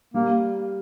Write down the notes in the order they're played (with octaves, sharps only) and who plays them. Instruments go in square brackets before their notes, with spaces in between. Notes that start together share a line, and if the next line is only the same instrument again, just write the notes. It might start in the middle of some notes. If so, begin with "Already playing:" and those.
[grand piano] G3 [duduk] A#3